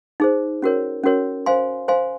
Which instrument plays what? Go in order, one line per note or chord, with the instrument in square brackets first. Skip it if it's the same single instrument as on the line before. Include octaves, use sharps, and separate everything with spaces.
[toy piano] D#4 G#4 C5
C#4 F#4 A#4 C#5
C#4 F#4 A#4 C#5
C5 F5 G#5 C6
C5 F5 G#5 C6